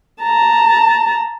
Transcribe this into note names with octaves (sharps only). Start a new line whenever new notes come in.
A5 A#5